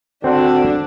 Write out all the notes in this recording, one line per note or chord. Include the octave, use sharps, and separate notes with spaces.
D3 C4 D4 F#4 C5 F#5